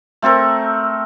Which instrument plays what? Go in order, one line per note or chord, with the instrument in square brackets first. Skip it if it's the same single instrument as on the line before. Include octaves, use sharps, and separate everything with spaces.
[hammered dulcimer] A3 C4 A4 A#4